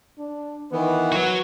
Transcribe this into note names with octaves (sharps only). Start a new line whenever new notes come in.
D4
D#3 E3 B3 B4
F#3 F#4